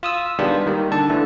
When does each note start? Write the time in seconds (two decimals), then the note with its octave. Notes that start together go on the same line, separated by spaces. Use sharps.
0.03 F4 D#6 E6
0.39 D#3 G3 G#3 B3 D4 F4
0.66 D#3 G3 A#3
0.92 D3 A4 A5
1.10 D3 E3 A3